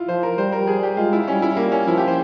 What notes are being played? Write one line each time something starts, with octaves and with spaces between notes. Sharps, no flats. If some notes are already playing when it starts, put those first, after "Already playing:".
Already playing: E4 F4
F3 C5
A#4
G3 C5
A#4
G#4
G4
G#3 F4
E4
G3 C#4
E4
A#3
C#4
F3 E4
G4
C5